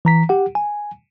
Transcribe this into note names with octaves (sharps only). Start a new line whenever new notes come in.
E3 A#5 B6
G4 F#5
G#5